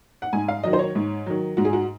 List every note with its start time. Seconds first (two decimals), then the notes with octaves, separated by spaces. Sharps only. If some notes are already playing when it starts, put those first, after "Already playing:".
0.22 F#5
0.33 G#2 G#5
0.48 F5
0.63 D#3 F#3 D#5
0.73 C5
0.79 C#5
0.95 G#2
1.26 D#3 F#3
1.57 G#2 F#4
1.65 G#4
1.73 F#4